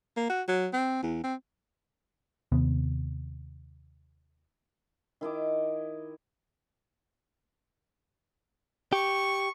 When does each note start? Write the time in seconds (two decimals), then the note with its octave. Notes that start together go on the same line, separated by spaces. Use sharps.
0.17 A#3
0.30 F#4
0.48 F#3
0.73 C4
1.03 E2
1.23 C4
2.52 D#2 C3 B3
5.21 D#3 E4 D#5 D6
8.93 G4 C#6